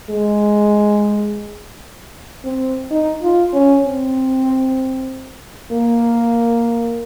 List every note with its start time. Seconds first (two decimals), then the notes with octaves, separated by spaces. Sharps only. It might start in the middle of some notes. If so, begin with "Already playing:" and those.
0.10 G#3
2.44 C4
2.91 D#4
3.23 F4
3.53 C#4
3.84 C4
5.72 A#3